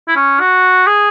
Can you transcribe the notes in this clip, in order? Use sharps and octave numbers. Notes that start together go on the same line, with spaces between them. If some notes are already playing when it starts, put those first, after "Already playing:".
E4
C#4
F#4
G#4